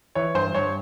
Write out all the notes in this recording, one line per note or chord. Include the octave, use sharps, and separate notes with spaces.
E3 C#5
G2 C5
G2 C#5